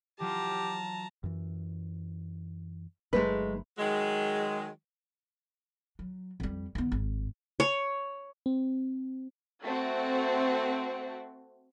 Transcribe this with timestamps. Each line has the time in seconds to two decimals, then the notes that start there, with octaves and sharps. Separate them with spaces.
0.20 E3 F#3 F4 G4 A5 A#5
1.24 F#2 E3
3.13 G1 F#3 G#3 A3 D#4 B4
3.78 D#3 F#3 G#3
5.99 F#3
6.40 F2 G3
6.75 D#3 B3
6.92 G#1
7.60 C#5
8.46 C4
9.62 A3 C4 F#4